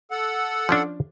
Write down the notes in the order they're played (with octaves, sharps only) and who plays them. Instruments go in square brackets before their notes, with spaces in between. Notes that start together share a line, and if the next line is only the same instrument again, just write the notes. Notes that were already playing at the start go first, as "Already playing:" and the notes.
[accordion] A4 F#5
[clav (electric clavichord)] F3 C#4 D4